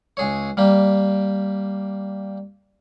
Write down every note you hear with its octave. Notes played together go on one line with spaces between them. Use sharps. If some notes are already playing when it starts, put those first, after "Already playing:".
C#2 G#4 C#5
G3 A#3 G4